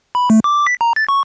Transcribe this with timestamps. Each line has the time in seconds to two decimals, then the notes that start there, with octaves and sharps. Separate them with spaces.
0.15 B5
0.30 A3
0.44 D6
0.67 B6
0.81 A#5
0.96 A6
1.09 C#6